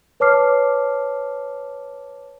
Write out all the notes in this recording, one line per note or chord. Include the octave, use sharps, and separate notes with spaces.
B4 C#5 A5 D6 F6 C7